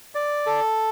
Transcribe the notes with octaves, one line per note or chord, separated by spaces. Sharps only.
D5
A4